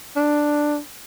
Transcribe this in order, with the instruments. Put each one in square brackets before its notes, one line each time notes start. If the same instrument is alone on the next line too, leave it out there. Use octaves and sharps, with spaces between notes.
[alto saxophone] D4